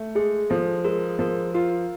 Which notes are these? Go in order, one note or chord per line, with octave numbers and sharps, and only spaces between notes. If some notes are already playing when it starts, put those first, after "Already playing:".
Already playing: A3
G#3 G#4
F3 A4
G#3 A#4
F3 A#4
F4 A#4